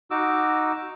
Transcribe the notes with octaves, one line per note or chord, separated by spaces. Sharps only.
D#4 F#4 D6 E6